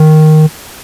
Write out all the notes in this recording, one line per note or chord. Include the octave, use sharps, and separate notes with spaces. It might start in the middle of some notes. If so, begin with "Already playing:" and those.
Already playing: D#3